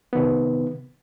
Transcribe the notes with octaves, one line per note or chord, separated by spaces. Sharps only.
C3 D#3 B3